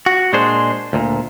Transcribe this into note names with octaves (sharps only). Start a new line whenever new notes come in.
F#4
A#2 G#3 D4 G#4 C5
D2 A#2